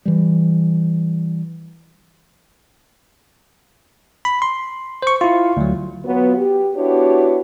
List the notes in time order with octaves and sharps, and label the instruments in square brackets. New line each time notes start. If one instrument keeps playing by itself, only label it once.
[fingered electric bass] E3 G3
[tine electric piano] B5
C6
C5 C#6
E4 F4
D2 F#3
[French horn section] F#3 B3 F4
G4
B3 D4 E4 F#4 G4 C#5